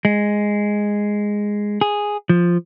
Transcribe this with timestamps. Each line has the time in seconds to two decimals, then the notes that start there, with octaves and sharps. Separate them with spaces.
0.05 G#3
1.81 G#4
2.29 F3